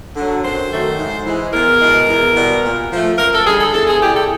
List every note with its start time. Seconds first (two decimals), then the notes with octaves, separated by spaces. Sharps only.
0.16 D3 F#3
0.44 F#2 C5
0.71 D#3 F#3 A3
0.98 G#2
1.25 E3 G#3
1.53 E2 A#4
1.81 B2 G#3
2.08 E2
2.36 B2 G3
2.64 A#2
2.91 F3 A3
3.18 F#2 A#4
3.33 A4
3.46 D3 G3 G#4
3.60 A4
3.73 E2 A4
3.88 G#4
4.02 C3 E3 G3 G4
4.15 A4